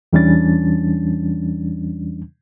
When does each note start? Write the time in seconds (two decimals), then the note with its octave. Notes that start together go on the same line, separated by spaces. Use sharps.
0.13 E2 E3 G3 C#4 D4 A6